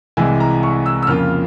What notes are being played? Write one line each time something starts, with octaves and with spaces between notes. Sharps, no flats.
C2 C3 E3 G#3 E4 G#5
A#5
C#6
E6
E6
F2 C#3 F3 A#3 F4 F6